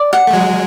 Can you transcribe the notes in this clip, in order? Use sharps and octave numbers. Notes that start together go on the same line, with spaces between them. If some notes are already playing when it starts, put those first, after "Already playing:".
Already playing: D5
F#5
A3
F#3 G#3